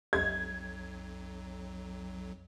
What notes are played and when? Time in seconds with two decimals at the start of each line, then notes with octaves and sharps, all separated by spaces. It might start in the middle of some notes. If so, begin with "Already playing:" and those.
0.13 B1 F2 F#3 G#6